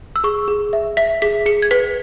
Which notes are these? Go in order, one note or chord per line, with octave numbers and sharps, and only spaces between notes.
E6
G#4 C#6
G#4
E5
E5 B6
G#4 B6
G#4 C#7
G#6
B4 B6